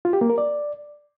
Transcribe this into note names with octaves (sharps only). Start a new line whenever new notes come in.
F4
G4
A#3
A#4
D5